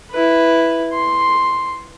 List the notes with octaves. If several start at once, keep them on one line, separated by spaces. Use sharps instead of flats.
E4 B4
C6